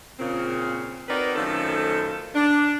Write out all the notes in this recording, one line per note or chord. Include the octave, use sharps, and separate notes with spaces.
A#2 C#3 C4
C4 D#4 F#4 A#4 B4 D5
F#2 D#3 F3 A3 C#4 A4
D4